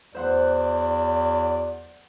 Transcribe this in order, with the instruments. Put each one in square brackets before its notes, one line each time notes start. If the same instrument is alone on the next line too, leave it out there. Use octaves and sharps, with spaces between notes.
[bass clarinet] E2 [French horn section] F#3 E4 D5 [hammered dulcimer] C5 F#5 C6